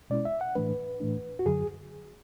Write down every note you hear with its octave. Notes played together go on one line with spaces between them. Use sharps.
B2 G#3 C#4 E4 D5
E5
F#5
A2 E3 A3 D4 B4
A2 E3 A3 D4
F#4
F#2 D3 F#3 G#4